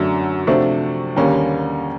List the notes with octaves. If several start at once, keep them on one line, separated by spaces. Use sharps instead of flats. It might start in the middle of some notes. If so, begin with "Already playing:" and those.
Already playing: F#2 D3 F#3 A3 D4
C3 F3 A3 D4 F#4
D#2 D3 G3 A#3 C#4